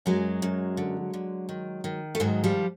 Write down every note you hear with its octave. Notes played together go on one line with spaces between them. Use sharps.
F#2 F#3 G#3
F#2
D3
D3
D#3
D#3
A3
G#2 F#3 G#3
F3 G3